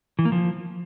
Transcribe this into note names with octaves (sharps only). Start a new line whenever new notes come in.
E3
A#3
F3